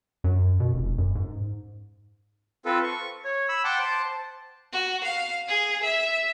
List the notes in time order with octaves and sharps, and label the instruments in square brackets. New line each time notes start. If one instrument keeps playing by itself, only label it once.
[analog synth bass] F#2
B2
F1
F#2
G#2
[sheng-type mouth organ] C4 F4 A4 B4
C#6
C#5
B5 E6
F#5 G5 A5 C6 D6
C5 A5
[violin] F#4
F5
G#4
E5